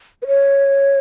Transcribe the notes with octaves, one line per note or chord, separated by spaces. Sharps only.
B4
C#5